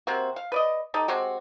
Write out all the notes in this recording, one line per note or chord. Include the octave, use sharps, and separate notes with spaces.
C3 A#3 C4 F#4
F5
B4 D5 D#5
D#4 G4 A4
G#3 C4 F#4 G4